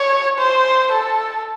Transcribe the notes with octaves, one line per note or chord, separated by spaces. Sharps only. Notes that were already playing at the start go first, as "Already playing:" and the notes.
Already playing: C#5
C5
A4